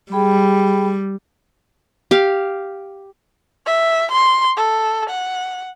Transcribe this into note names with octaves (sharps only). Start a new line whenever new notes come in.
G3 G#4 G5 B5
G4 F5
E5
C6
A4
F#5